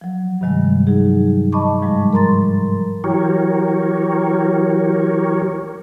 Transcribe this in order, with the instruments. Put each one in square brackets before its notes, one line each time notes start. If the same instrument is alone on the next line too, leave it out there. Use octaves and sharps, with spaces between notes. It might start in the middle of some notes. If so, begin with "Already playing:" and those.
[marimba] F3 F#3
G2 C3 D#3 G3 G#3
F#3 D#4 G#4
D#5 A5 B5 C#6 D6
G#2 F3 G3 G#3
A#4 A#5 C6 A6
[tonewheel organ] E3 F#3 G4 A#4 C#5